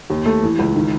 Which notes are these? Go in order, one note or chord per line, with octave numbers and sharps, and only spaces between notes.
D#2
A3
E3
C#2
D#3